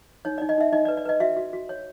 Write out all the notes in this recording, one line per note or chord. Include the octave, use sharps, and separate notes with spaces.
D#4 C#5
D5
D#4
D#5
D#4 E5
D#4 D#5
D5
B4
D5
B4 D#5
F#4 E5
F#4
F#4
C#5